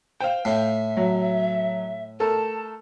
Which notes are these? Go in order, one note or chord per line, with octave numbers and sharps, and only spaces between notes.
C5 F5 G5
A2 E5
F#3
A3 A4 A#4 A5